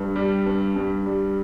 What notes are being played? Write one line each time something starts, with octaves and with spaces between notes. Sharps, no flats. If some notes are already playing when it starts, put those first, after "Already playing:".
Already playing: G2
G3
G2
G2
G3